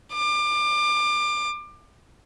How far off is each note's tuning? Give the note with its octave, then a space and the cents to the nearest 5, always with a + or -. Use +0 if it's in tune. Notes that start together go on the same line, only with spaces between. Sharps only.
D6 +30